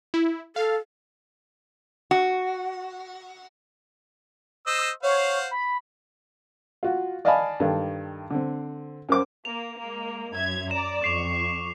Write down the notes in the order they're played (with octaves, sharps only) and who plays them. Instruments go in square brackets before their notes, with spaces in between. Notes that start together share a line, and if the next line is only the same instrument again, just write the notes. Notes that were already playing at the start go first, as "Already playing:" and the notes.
[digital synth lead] E4
[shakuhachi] A4 [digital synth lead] F5
[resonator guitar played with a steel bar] F#4
[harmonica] C5 D#5 E6
[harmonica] C5 F5 F#5 [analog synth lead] C#5
[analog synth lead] B5
[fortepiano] F4 F#4
D5 D#5 F5 G#5 A5 B5
G2 D#3 A4
D3 C4
F#2 A#4 C5 D6
[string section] A#3 [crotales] F7
[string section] G#3 A#3
F#2 E5 G#6
[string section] D5 A#5 [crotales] E7
[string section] F2 C#6 [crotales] D6 C7 F7